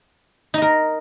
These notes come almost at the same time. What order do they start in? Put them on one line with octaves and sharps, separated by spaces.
D#4 D#5 A#4